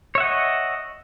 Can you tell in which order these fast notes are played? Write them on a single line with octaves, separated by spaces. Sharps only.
C#5 E5 F#5 D#5